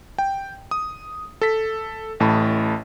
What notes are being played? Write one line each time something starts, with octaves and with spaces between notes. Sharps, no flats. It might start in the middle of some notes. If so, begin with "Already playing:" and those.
G5
D#6
A4 B6
A1 A2 A5 B5